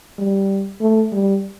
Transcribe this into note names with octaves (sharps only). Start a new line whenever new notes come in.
G3
A3
G3